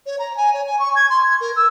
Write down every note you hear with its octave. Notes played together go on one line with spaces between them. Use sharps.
C#5
A#5
G#5
C#5
G#5
C#6
G#6
C6
G#6
A#4
E6